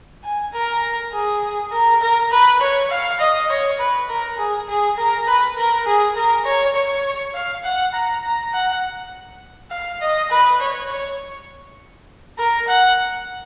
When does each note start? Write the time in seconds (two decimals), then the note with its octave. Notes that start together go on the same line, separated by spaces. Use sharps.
0.24 G#5
0.53 A#4
1.12 G#4
1.72 A#4
2.01 A#4
2.31 B4
2.60 C#5
2.90 F5
3.20 D#5
3.49 C#5
3.79 B4
4.09 A#4
4.38 G#4
4.68 G#4
4.97 A#4
5.27 B4
5.57 A#4
5.86 G#4
6.16 A#4
6.45 C#5
6.75 C#5
7.35 F5
7.64 F#5
7.94 A#5
8.23 A#5
8.53 F#5
9.71 F5
10.01 D#5
10.30 B4
10.60 C#5
10.90 C#5
12.38 A#4
12.68 F#5